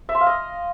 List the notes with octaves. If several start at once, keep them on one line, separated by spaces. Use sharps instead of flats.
E5
C6
F5
D#5